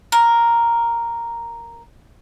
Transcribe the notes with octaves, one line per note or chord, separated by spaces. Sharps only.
A#4